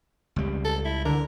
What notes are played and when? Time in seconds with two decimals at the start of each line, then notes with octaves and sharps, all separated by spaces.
0.36 C#2 G3
0.65 A4
0.85 E4
1.05 D3 A#4